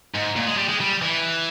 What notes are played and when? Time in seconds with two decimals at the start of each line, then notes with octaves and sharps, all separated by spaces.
0.15 G#2
0.36 A#2
0.47 G#3
0.58 G3
0.69 G#3
0.81 G3
1.02 E3